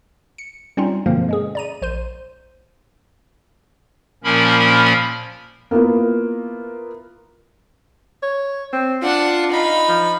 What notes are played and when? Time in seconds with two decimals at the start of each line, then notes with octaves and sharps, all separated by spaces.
0.38 C#7
0.77 G3 C4 C#4 D#4 F4
1.06 G2 B2 D3 F3 A#3 C4
1.29 G#3 C#4 G#4
1.55 D5 A#5 D#7
1.82 A#1 C5 C6 D#7
4.24 A#2 F3 A#3 C#4 A#4 B5
5.71 A#3 B3 E4 F4 A#4
8.23 C#5
8.73 C4
9.02 D4 F4 F#5
9.51 D#4 B5
9.88 F3